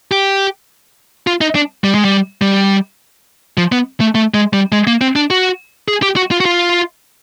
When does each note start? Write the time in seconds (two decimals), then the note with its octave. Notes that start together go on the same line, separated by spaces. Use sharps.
0.11 G4
1.27 F4
1.41 D#4
1.55 D4
1.84 G3
1.95 G#3
2.05 G3
2.42 G3
3.57 F3
3.72 B3
4.00 A3
4.15 A3
4.34 G#3
4.53 G3
4.72 G#3
4.87 A#3
5.01 C4
5.16 D4
5.30 F#4
5.88 G#4
6.02 G4
6.16 F#4
6.31 F4
6.40 F#4
6.45 F4